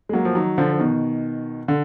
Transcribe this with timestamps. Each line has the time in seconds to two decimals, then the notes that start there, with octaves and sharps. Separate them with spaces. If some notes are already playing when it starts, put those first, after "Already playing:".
0.09 G#3
0.13 F#3 A#3
0.25 F3
0.35 D#3 F#3
0.58 D3 F3
0.73 F3
0.79 B2 D#3
1.68 D3